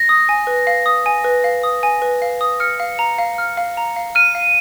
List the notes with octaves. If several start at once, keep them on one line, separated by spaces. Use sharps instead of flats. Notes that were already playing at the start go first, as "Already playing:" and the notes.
Already playing: A#6
D#6
G#5
B4
F5
D#6
G#5
B4
F5
D#6
G#5
B4
F5
D#6
F6 C#7
F5
A#5
F5
F6
F5
A#5
F5
F6 D#7
F5